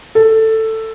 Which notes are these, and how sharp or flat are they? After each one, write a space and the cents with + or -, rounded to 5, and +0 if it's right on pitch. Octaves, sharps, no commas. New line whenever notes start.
A4 +10